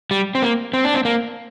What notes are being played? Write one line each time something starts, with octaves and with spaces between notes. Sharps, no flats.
G3
C4
A#3
C4
D4
C4
A#3